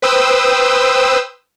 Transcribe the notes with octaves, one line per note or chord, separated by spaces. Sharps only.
B4 C5 G5 D#6 E6